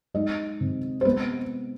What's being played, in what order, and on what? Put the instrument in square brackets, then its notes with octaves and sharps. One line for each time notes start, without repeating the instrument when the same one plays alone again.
[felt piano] G#3 D#4 D#5
C3
C5
G#3 B3 B4